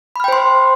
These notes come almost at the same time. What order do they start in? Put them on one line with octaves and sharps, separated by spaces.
B5 F6 G5 C5 C6